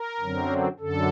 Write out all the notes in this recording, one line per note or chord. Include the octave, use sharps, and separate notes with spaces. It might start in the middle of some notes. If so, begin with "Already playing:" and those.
Already playing: A#4
F#2 D3 F#3 C4
F#2 D3 A4